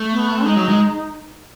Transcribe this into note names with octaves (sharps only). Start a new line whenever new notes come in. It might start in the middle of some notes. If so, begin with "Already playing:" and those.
Already playing: A3
B3
G#3 D#4
F#3
G#3